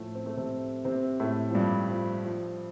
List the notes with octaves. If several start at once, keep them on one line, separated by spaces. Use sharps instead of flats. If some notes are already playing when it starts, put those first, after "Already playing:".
Already playing: A2 F3 A3
C4
A3
C3 C4
C3 C4
A2 A3
F3
G2 G3
F3
F3